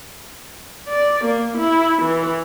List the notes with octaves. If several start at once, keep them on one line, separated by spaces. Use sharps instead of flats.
D5
A#3
E4
E3